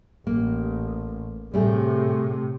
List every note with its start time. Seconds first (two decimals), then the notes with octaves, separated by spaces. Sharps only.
0.27 A1 A#3
1.54 A2 C3 G3 A3 G#4